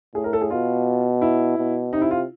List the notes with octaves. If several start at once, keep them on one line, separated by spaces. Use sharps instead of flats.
A2 G#4
A#4
A4
G#4
B2 F4
E4
B2
C3 D#4
E4
F4